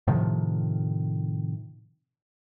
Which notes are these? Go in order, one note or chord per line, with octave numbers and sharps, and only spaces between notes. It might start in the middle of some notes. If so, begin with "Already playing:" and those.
A2 C3 D#3 F3